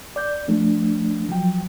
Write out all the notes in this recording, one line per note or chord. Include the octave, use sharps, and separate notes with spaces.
D5 G6
F3 A3 D4
F3 F#3 G5